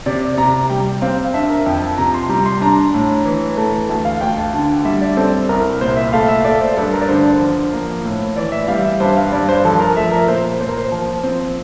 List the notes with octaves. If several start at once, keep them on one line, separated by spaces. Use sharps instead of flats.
C3 D5
C3 A#5
A#5
G3 G5
C4 F5
F5
D4 E5
A#4
F2 G5
A5
C3 A#5
C6
G3 A#5
C6
D4 A#5
A2
E3
A3
D2 A5
F5
D2 G5
A5
D3 A5
G3 E5
D5
C4 A4
C2 A#4
A#2 C5
E5
A3 F5
E5
A3 D5
C5
G2 A4
A#4
D5
D3 C5
F3
A#3
A2
E3 D5
E5
G3 F5
E5
G2 C5
F5
G2 D5
C5
F3 A4
A#4
A3 E5
A#4
A#2 C5
A#2 C5
A#4
C5
F3
C4